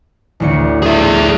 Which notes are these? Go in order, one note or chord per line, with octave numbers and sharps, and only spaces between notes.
A1 D2 C#7
G#4 E5